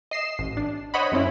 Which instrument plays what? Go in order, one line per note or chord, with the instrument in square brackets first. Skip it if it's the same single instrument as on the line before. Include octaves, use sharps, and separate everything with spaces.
[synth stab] D#5 C7 E7
A1
D4
C5 C#5 D#5 F#5 B5
F#2 C4 C#4 E4